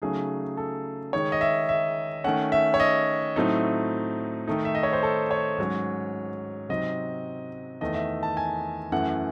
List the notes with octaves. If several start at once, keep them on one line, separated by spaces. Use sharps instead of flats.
C#3 F#3 A3 D#4 G#4
A4
D#3 G#3 D#4 C#5
D#5
E5
E5
D#3 A3 C#4 F#5
E5
C#5
D#5
A2 F#3 A3 C4 D#4
D#3 A3 D#4
E5
D#5
C#5
C5
A4
C#5
G#2 F#3 C#4
C3 F#3 C4 D#4 D#5
E2 D#3 A3 D#5
E5
A5
G#5
F#2 E3 A3 F#5